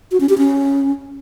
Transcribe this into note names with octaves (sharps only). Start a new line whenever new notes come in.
F#4
C#4
G4
C#4